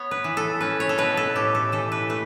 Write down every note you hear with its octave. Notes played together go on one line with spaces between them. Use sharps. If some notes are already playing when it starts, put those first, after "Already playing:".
Already playing: B3 C#5
B4
E3
A4
C#4 B4
C#5
A4
B2 B4
A4
A2 G4
A4
E3 A4
B4
A3 B4